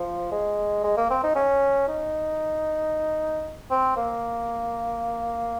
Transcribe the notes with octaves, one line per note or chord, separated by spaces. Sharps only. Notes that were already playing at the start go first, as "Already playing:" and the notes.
Already playing: F3
G#3
G#3
A#3
C4
D#4
C#4
D#4
C4
A#3